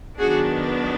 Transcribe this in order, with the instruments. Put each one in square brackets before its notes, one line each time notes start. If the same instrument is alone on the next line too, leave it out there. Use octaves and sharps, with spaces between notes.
[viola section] D#3 F#3 B3 D4 F#4 G#4